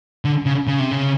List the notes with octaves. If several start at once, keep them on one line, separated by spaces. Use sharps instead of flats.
D3
C#3
C#3
C3
C#3